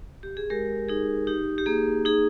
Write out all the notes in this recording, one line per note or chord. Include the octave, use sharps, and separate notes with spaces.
G4
G#4
G#3 G4 A#4
D#4 G#4
D#4 G4
G4
A#3 G#4
D#4 G#4